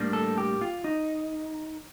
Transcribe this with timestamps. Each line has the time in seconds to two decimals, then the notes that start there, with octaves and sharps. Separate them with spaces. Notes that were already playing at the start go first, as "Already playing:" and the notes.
Already playing: A2 G3 A#3 D4
0.13 A4
0.38 G4
0.61 F4
0.84 D#4